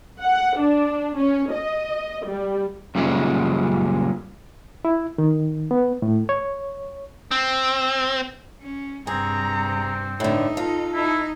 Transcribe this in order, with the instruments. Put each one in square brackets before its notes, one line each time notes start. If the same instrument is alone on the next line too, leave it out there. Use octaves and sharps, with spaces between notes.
[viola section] F#5
D4
C#4
D#5
G3
[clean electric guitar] F#2 A#2 C#3 G3 G#3
[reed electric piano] E4
D#3
B3
A2
C#5
[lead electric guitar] C4
[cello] C#4
[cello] G2 C3 [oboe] C4 [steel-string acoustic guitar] G#4 [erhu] A#5
[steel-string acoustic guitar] A2 D3 [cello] D#4 [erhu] E5
[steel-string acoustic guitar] F4 [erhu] A4
[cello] D#4 [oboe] E4